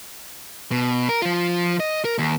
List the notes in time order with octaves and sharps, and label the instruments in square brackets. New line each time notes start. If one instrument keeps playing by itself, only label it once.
[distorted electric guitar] B2
A#4
F3 F4
D#5
A#4
D#2